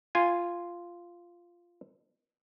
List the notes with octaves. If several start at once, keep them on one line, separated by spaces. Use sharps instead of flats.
F4 G#5